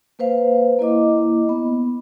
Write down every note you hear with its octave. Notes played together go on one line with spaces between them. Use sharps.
A#3 B4 C5 F5
A#3 E4 D#5 D6
B3